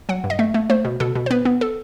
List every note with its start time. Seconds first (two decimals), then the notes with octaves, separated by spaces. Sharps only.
0.09 F#3 F#5
0.24 G2
0.30 D#5
0.39 A3 E5
0.54 A3
0.70 A3 C5
0.85 B2
1.00 B2 A4
1.15 B2
1.26 C5
1.30 B3 B4
1.45 B3
1.61 A4